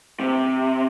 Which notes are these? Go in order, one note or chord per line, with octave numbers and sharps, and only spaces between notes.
C3